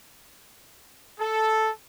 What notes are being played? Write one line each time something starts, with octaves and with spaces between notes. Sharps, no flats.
A4